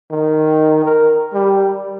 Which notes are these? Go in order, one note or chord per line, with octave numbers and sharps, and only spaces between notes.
D#3
A#4
G3